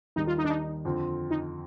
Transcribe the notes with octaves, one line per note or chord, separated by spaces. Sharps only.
D#2 D#3 G3 D#4
F4
D#4
D4
D#4
F2 D3 F3 C4
D#4